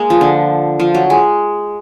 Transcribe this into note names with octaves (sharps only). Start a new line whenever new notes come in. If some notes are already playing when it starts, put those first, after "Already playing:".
Already playing: G#3 A#3
F3
D3
F3
F#3
G#3